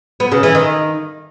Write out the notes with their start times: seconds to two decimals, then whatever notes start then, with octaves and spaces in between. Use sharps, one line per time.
0.20 B3
0.32 C#3
0.43 E3
0.55 D#3